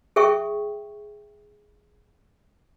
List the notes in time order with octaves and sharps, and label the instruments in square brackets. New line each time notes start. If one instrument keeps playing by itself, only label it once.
[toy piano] G#4 A4 E5 G5 C#6